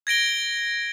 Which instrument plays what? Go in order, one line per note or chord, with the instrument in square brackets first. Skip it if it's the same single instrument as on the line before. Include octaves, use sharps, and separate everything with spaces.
[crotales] G#6 A#6 D7 G7